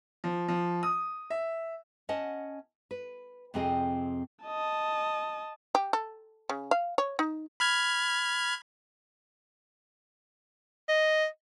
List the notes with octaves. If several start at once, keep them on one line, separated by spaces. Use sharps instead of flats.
F3
F3
D#6
E5
C#4 D#5 F#5 A5
B4
F2 C3 C4 F4 G#4 D#5
D#5 A5
G4
A4
C#3
F5
C#5
D#4
B5 F6 G#6
D#5